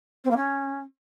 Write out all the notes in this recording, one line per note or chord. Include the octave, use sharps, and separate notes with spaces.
C4
A#3
C#4